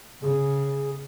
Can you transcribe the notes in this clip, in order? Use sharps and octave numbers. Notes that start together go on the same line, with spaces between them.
C#3 G#4